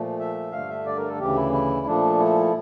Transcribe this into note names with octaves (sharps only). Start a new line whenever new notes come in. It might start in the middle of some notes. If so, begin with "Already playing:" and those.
Already playing: A#2 F3 A3
E5
G2 D3 A3 F5
E5
D5
A#4
A4
D2 C#3 E3 G4
E4
E4
A#2 F3 A3 D4
E4